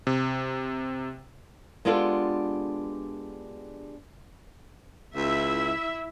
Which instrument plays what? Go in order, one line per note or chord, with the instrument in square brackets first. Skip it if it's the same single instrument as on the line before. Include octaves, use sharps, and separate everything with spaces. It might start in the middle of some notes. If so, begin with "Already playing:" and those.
[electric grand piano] C3
[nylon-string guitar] G#3 B3 D4 F4 G4 A4
[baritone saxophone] C#2 [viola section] E4 E5